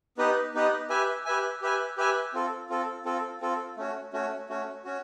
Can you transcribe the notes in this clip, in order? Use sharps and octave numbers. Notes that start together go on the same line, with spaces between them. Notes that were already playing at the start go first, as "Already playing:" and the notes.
B3 D#4 G4 B4 D#5
B3 D#4 G4 B4 D#5
G4 B4 E5 G#5
G4 B4 E5 G#5
G4 B4 E5 G#5
G4 B4 E5 G#5
C4 F4 A4
C4 F4 A4
C4 F4 A4
C4 F4 A4
A3 C#4 F#4
A3 C#4 F#4
A3 C#4 F#4
C#4 F#4